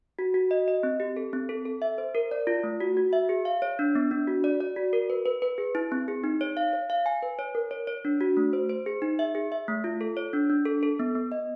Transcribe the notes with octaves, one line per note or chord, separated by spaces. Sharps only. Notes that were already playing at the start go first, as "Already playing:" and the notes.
F#4
F#4
D#5
D#5
C4
G4
A4
C4
A4
A4
E5
C5
A#4
D5
F4
A3
F#4
F#4
E5
G#4
F5
C#5
D4
B3
D4
F#4
D5
D5
F#4
A#4
B4
B4
B4
G#4
E4
C4
G#4
D#4
C#5
F5
C#5
F5
G#5
B4
C#5
A#4
C#5
C#5
D4
F#4
A3
C5
C5
G#4
D#4
E5
G#4
E5
A3
F4
A4
C#5
D4
D4
A4
A4
B3
B3
D#5